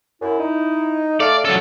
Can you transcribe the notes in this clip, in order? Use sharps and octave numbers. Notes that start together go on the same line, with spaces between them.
F#2 E4
D#4
A3 D5 F5
F#3 C#4 A4